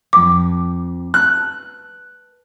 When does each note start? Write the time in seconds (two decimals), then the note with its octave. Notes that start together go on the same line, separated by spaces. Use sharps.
0.13 F2 G5 D6
1.14 B4 A5 F#6